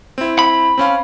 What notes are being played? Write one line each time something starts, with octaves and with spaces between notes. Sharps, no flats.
C4 E4
B5
C4 C#4 F5